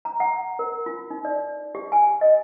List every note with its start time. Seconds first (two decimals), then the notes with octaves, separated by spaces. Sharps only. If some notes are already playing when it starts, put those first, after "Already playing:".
0.05 A#5
0.20 F#5
0.59 A#4
0.86 F4
1.10 D#4
1.25 D5
1.75 G4
1.92 G#5
2.21 D#5